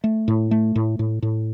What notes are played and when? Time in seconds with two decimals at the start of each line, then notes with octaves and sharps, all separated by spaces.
0.04 A3
0.28 A2
0.51 A3
0.76 A2
0.99 A2
1.22 A2